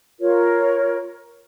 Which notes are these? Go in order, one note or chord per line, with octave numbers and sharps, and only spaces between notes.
F4 A#4 C#5